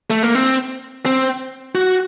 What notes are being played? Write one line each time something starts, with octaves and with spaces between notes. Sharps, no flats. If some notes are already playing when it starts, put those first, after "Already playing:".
A3
A#3
C4
C4
F#4